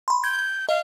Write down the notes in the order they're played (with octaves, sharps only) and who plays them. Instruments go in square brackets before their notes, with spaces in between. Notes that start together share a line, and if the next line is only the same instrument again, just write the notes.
[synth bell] B5 C6
[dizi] G6 [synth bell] G#6
[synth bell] D#5 [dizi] F5